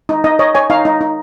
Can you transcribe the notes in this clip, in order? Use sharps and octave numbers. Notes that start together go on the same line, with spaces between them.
D#4
D#4 D#5
C#5 D#5
C#5 G#5
D#4 F5
D#4
D#4